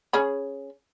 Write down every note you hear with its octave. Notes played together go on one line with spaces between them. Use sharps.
C#4 G#4 B5